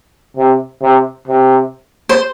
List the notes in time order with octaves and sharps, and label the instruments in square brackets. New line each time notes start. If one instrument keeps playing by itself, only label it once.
[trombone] C3
C3
C3
[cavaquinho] C5